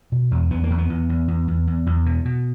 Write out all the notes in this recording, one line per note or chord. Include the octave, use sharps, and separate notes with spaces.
B2
E2
E2 B3
A#3
E2
B3
E2
E2
E2
E2
E2
E2
B2
B2